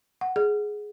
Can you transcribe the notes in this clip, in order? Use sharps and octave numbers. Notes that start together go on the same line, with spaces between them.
F#5
G#4